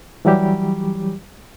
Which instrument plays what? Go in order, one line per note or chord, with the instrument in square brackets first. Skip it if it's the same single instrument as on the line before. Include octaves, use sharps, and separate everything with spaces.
[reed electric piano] E3 F#3 G3 G4